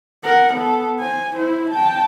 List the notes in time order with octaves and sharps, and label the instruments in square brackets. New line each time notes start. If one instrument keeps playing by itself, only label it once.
[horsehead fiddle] A#4 F#5
B3 A4
C5 G#5
E4 C5
G5 A5